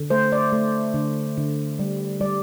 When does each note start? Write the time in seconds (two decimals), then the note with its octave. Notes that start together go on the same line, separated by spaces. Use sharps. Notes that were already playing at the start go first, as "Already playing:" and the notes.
Already playing: D3
0.10 A3 C5
0.32 D5
0.52 A3
0.94 D3
1.37 D3
1.79 G3
2.21 G3 D5